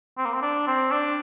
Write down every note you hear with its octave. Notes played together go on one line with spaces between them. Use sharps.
C4
A#3
C4
D4
C4
D4